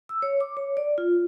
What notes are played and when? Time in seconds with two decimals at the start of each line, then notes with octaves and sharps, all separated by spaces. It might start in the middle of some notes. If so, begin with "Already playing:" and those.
0.09 E6
0.22 C#5
0.41 D6
0.57 C#5
0.77 D5
0.98 F4